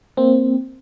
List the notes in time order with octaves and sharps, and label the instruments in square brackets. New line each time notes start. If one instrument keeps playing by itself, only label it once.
[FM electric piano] A#3 C4